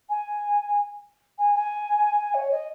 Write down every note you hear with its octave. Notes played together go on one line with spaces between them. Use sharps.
G#5
G#5
G#5
C#5
D#5